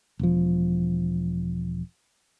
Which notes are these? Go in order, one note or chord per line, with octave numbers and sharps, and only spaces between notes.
E1 F3